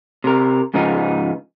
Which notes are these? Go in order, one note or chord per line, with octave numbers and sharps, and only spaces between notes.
C3 A#4
G#2 C#3 F3 B3 D#4